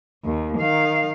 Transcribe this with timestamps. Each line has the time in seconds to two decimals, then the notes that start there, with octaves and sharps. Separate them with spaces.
0.25 D#2
0.58 D#3 F5